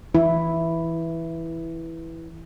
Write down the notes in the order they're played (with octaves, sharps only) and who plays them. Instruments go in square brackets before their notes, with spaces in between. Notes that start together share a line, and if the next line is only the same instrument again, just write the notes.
[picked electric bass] E3 [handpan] E4